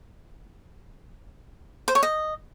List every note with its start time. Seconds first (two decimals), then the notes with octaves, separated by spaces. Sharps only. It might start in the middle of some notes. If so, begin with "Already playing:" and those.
1.88 C5
1.95 C#5
2.03 D#5